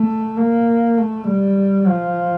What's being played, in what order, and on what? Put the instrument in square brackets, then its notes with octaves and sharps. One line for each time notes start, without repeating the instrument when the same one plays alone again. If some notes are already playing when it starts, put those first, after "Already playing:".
Already playing: [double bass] A3
A#3
A3
G3
F3